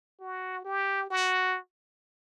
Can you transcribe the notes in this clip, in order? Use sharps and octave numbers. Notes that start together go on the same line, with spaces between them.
F#4
G4
F#4